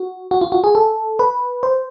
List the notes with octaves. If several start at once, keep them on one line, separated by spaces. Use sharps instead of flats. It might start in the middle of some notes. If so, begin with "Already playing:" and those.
Already playing: F#4
F#4
F4
F#4
G#4
A4
B4
C5